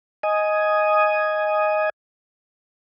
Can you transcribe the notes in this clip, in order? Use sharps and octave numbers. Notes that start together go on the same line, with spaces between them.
D#5 G#5 D#6